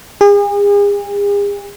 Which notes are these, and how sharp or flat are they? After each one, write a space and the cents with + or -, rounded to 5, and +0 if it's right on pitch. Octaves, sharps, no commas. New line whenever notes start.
G#4 -40